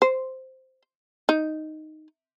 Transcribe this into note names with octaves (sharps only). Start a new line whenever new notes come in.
C5
D#4